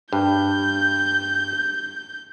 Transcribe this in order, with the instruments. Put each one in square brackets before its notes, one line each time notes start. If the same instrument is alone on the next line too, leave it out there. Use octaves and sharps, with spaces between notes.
[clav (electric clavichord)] G2 [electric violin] G6